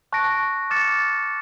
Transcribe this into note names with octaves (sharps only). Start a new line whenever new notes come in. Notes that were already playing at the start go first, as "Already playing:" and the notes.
A5 C#6 F#6 A#6 D7
D6 F6 A6 C#7 E7